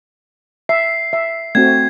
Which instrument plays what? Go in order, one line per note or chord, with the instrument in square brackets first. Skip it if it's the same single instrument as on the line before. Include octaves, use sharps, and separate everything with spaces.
[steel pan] E5 [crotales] C7
[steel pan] E5
[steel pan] A3 C4 F#4 [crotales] G#6